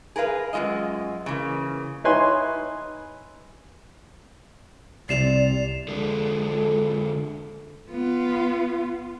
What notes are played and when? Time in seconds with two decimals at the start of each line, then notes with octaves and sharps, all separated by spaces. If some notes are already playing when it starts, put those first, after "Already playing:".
0.16 G#4 A#4 B4 F5
0.53 F#2 D#3 G#3 F4 D#5
1.26 C#3 E3 A#3
2.04 D#4 E4 B4 C#5 G#5 C6
5.09 C2 C3 D5 C7 E7 F7
5.89 D3 G#3 A4
7.90 B3 F4